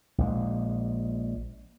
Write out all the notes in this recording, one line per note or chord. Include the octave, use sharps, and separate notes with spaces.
A#1 G#3